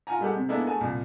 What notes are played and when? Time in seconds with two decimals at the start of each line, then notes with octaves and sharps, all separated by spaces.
0.07 F4 F#5 G#5 A#5
0.21 G3 G#3 G4 A4 F#5
0.36 C3
0.48 G#3 A#3 B3 D4 E4 A4
0.67 A3 F#4 G#4 G#5 A5
0.81 C2 A#2